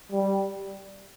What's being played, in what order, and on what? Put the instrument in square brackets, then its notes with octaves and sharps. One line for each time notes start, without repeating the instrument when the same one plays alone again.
[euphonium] G3